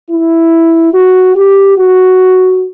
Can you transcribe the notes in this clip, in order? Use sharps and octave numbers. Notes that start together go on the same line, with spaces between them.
E4
F#4
G4
F#4